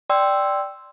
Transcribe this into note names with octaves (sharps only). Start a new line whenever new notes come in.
D5 G5 C6 E6